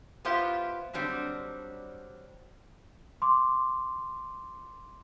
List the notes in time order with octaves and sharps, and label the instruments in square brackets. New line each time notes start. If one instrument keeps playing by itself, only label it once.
[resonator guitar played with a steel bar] B3 E4 F4 G4 C5
D3 F#3 G3 C4 D4
[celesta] C6 D6